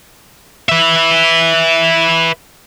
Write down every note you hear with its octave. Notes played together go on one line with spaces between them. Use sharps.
B4 E5